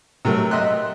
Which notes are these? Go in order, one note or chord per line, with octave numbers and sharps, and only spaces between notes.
C3 F#3 A3 A#4
D#5 E5 C6 F#6